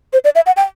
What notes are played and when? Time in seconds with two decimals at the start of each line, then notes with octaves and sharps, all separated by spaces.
0.13 C5
0.24 D5
0.35 E5
0.46 F#5
0.57 G5